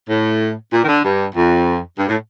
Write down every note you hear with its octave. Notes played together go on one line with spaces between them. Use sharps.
A2
A#2
D#3
D3
G2
F2
G2
A2